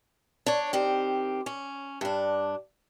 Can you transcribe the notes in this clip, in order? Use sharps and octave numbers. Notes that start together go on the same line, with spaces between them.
D4 C#5
D#3 C4 G4
C#4
G2 D4